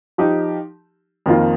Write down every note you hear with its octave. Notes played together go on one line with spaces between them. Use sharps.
F3 D#4 G4
F2 D#3 A#3 F4